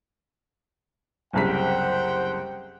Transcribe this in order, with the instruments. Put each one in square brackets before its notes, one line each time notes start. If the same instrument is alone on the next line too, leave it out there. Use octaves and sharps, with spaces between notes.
[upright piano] F#1 C2 B6 [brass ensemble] C5 F#5 G5